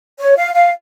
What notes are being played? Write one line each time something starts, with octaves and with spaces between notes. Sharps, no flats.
C#5
F5
F5